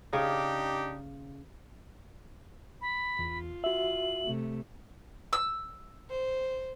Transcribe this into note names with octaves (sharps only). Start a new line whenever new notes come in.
C#3 D4 D#4 G4
B5
E2 F4
F#4 E5 F#7
C3 A3
E6
C5